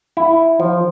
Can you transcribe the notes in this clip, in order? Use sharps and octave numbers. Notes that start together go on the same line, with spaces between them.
E4
F3